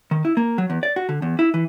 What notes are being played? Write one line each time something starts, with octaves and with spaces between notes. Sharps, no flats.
D#3
E4
A#3
F#3
E2
D5
F#4
D3
E2
E4
E3